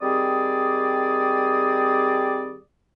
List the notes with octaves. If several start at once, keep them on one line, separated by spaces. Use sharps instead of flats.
D#3 G3 C4 G#4 D5 D#6